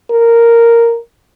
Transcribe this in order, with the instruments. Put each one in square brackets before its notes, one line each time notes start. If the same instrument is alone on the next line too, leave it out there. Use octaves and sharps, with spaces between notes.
[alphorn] A#4